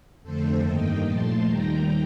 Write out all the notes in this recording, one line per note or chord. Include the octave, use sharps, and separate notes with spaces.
F2 D3 A3 A4 C5
G2 D#3 A#3 D#5 G5
A#2 F3 A3 A5 C6
D#2 D#3 G3 G5 A#5